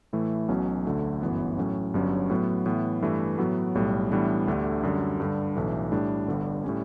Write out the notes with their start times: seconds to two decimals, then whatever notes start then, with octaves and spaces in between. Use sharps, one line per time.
0.13 A2 E3 A3 E4
0.48 B1 B2 F#3 C#4
0.85 D2 D3 A3
1.21 G1 F#2 E3 B3
1.58 A2 F#3 C#4
1.94 G1 G2 F#3 C#4
2.30 A2 F#3 B3
2.66 A2 E3 B3
3.02 G2 E3 A3
3.38 A2 F#3 B3 F#4
3.75 B1 A2 G3
4.11 A2 E3 G3 B3 D4
4.47 D2 D3 A3 D4 G4
4.83 F#2 D3 G3
5.20 G2 D3 G3
5.56 B1 A2 E3 A3 D4
5.92 A2 G3 D4
6.28 G1 G2 D3 G3
6.64 A2 G3 C#4